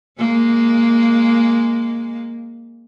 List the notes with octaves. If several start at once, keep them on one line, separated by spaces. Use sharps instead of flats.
G#3 A#3